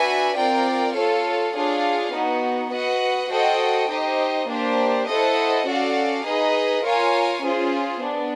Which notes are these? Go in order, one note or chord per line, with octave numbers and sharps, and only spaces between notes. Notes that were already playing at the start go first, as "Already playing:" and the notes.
Already playing: D4 F#4 B4 E5 G#5
C4 F4 A#4 D5 G5
F4 A4 C#5 F5
D4 F4 G#4 C#5 F5
B3 D#4 F#4
F#4 B4 D#5 F#5
F#4 A4 C5 D#5 G5
D#4 G4 C5 D#5
A#3 D4 G4 C5
E4 A4 C5 D#5 F#5
C#4 F#4 A4 D5 F5
D#4 G#4 B4 D#5
F4 A#4 C#5 F5 G#5
C#4 F4 G#4 C5
B3 D4